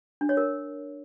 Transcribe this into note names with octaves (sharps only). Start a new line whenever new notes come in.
D4
C#5
A#4